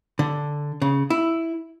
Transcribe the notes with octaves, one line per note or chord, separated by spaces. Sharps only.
D3
C#3
E4